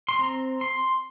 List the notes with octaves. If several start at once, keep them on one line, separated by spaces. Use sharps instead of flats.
C6
C4 A#5
C6